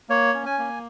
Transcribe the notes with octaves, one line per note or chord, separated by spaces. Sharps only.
A#3 C#5
C#4
G#5
A#3